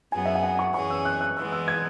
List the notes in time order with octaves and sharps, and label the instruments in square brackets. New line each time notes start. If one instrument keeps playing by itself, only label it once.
[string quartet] F#2 F#3 B3 G#4 [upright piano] G#5
[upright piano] E5
F#5
G#5
C#6
[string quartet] F#2 E3 C#4 G#4 [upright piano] C#6
[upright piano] E6
F#6
F#6
[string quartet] E3 G#3 B3 [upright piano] E6
[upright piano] E6
G#6